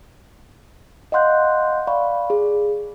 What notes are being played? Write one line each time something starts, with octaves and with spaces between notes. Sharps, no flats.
D#5 F5 F#5 C6 F#6 G6
D5 F5 B5 C#6
G#4